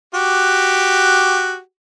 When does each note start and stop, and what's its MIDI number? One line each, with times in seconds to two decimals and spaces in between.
0.14 1.59 66
0.14 1.59 67